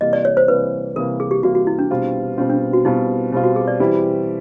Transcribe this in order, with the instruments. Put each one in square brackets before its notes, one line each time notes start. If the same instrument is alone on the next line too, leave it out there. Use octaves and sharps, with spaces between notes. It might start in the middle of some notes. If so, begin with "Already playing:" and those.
[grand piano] C3 E3 G3 A#3 [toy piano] D#5
[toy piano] D5
C#5
C5
[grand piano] C3 E3 G3 A#3 [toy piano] B4
[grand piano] C3 E3 G3 A#3 [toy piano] A#4
[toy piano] G#4
G4
[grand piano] C3 E3 G3 A#3 [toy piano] F#4
[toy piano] F#4
E4
D4
[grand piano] B2 G3 C4 F4
[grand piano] B2 G3 C4 F4 [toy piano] C#4
[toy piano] D4
F#4
[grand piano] B2 G3 C4 F4 [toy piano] E4
[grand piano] B2 G3 C4 F4
[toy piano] F#4
G#4
D5
[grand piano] E3 G3 C4 E4 G4